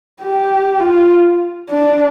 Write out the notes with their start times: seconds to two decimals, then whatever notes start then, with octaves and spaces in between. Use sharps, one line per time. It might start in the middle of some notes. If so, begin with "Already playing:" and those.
0.22 G4
0.81 F4
1.70 D4